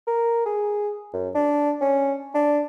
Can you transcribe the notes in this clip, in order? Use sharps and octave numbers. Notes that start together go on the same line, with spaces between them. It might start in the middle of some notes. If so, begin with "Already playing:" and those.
A#4
G#4
F#2
D4
C#4
D4